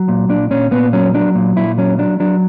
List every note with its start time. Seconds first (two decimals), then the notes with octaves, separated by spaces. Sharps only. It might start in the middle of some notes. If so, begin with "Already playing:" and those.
Already playing: F#3
0.08 A#2
0.29 A#2 D4
0.51 A#2 C#4
0.71 A#2 B3
0.93 F#3 C#4
1.14 F#3 D4
1.35 A#2
1.56 A#2 E4
1.78 F#3 C#4
1.99 F#3 D4
2.20 F#3 D4